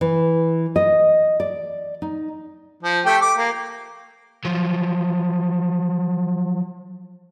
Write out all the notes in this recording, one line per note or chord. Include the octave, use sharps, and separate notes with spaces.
E3
D#5
D5
D#4
F3
A3 G4 G5
D6
A#3
F3 F#3